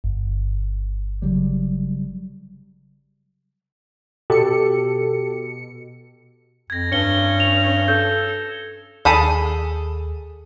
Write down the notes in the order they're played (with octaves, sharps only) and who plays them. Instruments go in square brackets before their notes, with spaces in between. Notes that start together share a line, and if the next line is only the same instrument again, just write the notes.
[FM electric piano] G1
[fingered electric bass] C#3 F#3 G3
[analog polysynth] B2 C#7 [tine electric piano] G4 [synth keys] A4
[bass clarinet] F2 [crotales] G#6 A#6
[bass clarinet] G2 [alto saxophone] C#4 [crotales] C#7 G7
[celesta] F7
[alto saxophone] A4 [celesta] G6
[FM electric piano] D#2 [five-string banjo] G#4 A4 B5